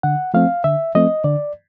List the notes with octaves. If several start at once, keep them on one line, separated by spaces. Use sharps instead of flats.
D3 F#5
F3 A3 C4 F5
D3 E5
F3 A3 C4 D#5
D3 D5